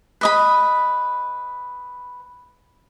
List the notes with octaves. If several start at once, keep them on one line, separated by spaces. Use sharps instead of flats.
B4 D#5 B5